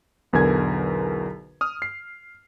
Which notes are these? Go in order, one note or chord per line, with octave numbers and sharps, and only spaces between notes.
B1 E2 D3 A#4 G#5 G#6
D#6 F6
C7